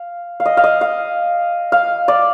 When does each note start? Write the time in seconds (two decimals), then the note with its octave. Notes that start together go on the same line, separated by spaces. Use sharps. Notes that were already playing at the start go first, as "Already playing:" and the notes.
Already playing: F5
0.40 F5
0.46 D#5
0.57 F5
0.64 D#5
0.81 F5
1.72 F5
2.08 D5